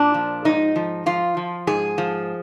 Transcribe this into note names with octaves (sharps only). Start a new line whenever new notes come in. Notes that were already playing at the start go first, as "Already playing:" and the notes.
Already playing: A#2 D4
F3
G#2 D#4
F3
F3 F4
F3
G#2 G#4
F3